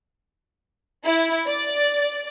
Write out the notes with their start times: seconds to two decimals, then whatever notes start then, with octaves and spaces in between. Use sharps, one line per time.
1.04 E4
1.46 D5